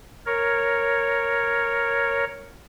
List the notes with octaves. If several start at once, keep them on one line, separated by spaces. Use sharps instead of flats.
A#4 C#5